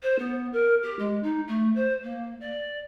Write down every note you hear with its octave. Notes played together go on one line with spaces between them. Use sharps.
C5
B3
A#4
G4
G#3
D#4
A3
C5
A#3
D5